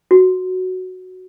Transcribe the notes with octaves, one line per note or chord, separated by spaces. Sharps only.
F#4